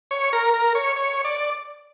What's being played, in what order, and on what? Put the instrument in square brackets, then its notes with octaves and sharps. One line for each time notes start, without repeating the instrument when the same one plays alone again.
[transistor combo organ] C#5
A#4
A#4
C#5
C#5
D5